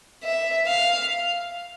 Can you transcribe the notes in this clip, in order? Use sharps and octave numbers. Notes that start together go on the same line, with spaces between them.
E5
F5